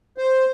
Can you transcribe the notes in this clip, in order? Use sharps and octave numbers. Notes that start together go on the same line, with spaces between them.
C5